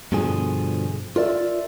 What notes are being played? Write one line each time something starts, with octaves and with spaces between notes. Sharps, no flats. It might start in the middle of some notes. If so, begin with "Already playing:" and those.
G2 B2 D3 F3 G#4
F4 A#4 D5 E5